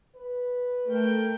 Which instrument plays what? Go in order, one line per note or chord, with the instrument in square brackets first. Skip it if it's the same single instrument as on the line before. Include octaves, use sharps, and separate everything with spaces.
[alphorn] B4
[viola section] A3 A#4 G5